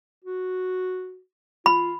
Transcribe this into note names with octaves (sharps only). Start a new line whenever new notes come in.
F#4
F4 B5